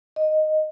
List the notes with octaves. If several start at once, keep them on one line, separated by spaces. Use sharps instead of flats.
D#5